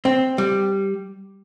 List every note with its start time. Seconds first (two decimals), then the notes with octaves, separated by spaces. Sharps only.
0.05 C4
0.38 G3